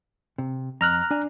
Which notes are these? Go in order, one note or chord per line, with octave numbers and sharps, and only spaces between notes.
C3
F2 A#5 F6 F#6
D4 G#5